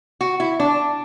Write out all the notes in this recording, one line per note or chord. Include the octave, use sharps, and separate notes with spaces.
F#4
E4
D4